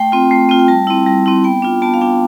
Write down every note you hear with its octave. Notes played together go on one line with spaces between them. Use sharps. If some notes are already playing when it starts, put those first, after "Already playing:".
Already playing: A3 G5
C4 F4
A3
C4 F4
G5
G3 A5
C4 E4
G3
C4 E4
B3 G5
D4 F4
B3 A5
F5
D4 F4 G5